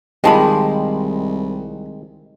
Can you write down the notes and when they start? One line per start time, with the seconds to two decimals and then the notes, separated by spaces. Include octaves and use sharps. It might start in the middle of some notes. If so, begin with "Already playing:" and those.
0.24 C2 D#3 G#3 F4 G4 D#5 A5 B5